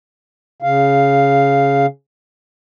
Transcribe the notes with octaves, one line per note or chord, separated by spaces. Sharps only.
C#3 F5